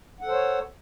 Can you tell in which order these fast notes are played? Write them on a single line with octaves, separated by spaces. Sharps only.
F#5 A4 C5 C#5